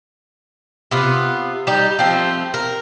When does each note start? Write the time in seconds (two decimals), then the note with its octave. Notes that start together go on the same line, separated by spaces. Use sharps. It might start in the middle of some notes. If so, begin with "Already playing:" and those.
0.91 C3 B3 F4
1.67 G3 D#4 G4
1.99 F3 A3 C4 G4
2.54 A#4